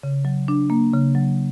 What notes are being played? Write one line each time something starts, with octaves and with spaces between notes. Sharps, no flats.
C#3
F#3
D4
A#3
C#3
F#3